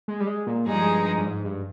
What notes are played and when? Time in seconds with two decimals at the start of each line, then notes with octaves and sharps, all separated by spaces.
0.08 G#3
0.20 G3
0.27 G#3
0.47 A#2
0.66 G2 F3 G#3 D#4 G#4
1.18 G2
1.26 G#2
1.44 G2